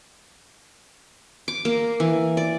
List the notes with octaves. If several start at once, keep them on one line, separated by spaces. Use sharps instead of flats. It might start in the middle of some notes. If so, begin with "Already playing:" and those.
D6
A#3
E3
D5